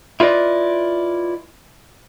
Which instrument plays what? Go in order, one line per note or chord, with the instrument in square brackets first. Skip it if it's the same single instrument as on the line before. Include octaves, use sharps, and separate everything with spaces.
[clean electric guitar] E4 F4 B4 D5 D#5